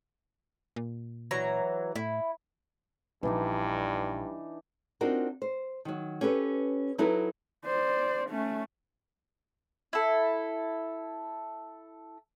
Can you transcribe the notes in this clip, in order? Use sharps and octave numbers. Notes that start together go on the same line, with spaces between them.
A#2
E3 F#3 A#5
A2 E4
A#1 G2 E3 D4 D#4
C4 D4 D#4 F4 F#4 A#4
C5
D#3 F#3
C#4 G4 A4 B4
F#3 D#4 E4 F#4 A4 B4
C5 D5
A3 C#4
E4 A4